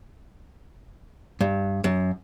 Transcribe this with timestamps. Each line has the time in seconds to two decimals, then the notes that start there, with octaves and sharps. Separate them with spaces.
1.41 G2
1.84 F#2